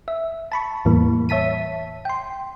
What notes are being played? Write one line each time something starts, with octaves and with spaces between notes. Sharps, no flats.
E5
A5 B5 C#6
E2 A2 E3 G3 A#3
C#5 E5 A5 B6 D#7
G5 C6